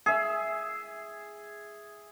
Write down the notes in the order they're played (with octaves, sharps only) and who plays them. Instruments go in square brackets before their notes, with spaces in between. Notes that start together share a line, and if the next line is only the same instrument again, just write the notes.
[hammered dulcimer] G#4 E5